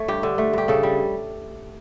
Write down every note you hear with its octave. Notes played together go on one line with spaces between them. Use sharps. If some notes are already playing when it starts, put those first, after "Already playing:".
Already playing: A3 C#5
G2 G4
D3
A3
G2 G4
C#3 A4
G3